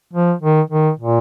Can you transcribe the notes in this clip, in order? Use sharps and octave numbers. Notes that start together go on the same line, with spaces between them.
F3
D#3
D#3
A#2